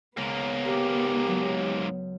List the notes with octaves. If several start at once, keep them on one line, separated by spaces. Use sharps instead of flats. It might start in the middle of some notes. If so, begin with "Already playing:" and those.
C#2 G#2 A#3 B3 A#5
G4 A#4
F#3